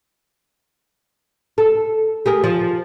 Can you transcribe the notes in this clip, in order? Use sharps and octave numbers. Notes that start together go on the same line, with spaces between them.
A4
G4 G#4 A#4
F3